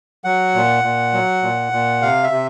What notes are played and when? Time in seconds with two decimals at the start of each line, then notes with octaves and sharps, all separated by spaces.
0.24 F#3 F#5
0.54 A#2
0.84 A#2
1.13 F#3
1.43 A#2
1.72 A#2
2.02 C3 F5
2.24 E5
2.31 C3